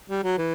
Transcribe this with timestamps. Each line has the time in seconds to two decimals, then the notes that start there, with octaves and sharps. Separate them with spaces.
0.10 G3
0.24 F#3
0.38 E3